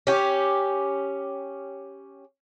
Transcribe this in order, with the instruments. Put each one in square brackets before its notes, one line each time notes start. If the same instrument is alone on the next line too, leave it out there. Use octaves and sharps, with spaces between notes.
[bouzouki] C#4 G4